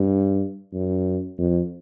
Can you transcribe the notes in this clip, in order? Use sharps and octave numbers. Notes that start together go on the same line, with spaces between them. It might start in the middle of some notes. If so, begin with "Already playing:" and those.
Already playing: G2
F#2
F2